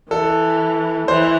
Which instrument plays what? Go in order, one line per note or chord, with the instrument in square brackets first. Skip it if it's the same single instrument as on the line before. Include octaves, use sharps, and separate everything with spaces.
[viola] E3 [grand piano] A4
[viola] E3 [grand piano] C5